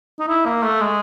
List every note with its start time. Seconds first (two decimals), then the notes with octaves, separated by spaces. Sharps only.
0.19 D#4
0.28 E4
0.45 A#3
0.63 A3
0.81 G#3